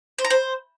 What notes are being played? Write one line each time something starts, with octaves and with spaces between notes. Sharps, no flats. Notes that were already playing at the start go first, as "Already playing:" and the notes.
C5
A#5
C5